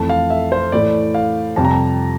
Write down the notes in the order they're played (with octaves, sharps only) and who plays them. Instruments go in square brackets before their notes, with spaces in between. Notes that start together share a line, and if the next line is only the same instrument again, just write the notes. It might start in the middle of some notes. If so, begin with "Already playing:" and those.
Already playing: [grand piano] F2 E3 A3 A5
F5
E5
C5
A2 E3 A3 D5
F5
F2 C3 G3 A5
A#5
A5